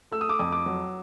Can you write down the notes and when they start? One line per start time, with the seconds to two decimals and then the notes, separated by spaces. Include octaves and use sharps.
0.12 A3 E6
0.21 D#6
0.29 D6
0.39 F2 D#6
0.52 D6
0.66 F#3